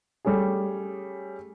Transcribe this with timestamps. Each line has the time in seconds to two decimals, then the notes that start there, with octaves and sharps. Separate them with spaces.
0.25 G3 A3 C#4 G#4